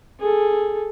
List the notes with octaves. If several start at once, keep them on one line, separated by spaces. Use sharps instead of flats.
G#4 A4